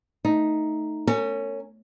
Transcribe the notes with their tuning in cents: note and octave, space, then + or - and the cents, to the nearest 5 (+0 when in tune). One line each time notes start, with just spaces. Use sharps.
A3 +0 D#4 +0
C#4 +0 A#4 -45